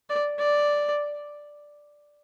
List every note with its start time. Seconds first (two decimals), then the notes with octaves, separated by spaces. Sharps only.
0.10 D5
0.39 D5